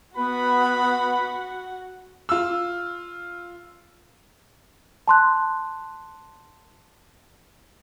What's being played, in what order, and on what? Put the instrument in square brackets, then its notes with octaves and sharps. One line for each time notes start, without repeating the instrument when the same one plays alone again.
[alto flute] B3 [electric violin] F#4 F#5 [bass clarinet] B4 [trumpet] B5
[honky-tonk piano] F4 E6
[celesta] A5 C6 F#6